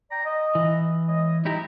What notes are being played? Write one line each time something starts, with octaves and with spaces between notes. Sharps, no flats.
D5 G5 A#5
D#5
E3
G#3 C#5 D#5
F#3 G#3 D#4 E4 G4 A#5